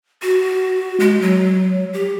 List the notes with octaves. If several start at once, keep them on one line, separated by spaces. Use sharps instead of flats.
F#4
G#3
F#3
G4